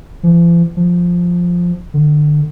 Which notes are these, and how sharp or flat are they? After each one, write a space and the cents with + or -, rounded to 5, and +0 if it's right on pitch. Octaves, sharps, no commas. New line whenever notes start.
F3 -45
F3 +5
D3 +25